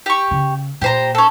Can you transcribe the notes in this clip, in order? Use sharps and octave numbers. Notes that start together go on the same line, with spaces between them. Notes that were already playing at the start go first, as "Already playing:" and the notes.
G4 C#6
C#3
A#2 G4 C5 A#5
C#4 A4